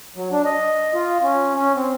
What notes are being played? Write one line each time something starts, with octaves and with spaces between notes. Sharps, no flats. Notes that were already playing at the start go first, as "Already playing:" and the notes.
F#3
D4
D#5
F4
C#4
C#4
C4